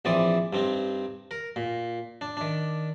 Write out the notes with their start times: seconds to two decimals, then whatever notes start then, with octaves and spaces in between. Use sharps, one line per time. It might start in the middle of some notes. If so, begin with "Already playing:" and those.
0.05 A#1 E3 C4 D5 D#6
0.53 G2 C4 D#4
1.31 A#4
1.56 A#2
2.21 D4
2.37 D#3 D4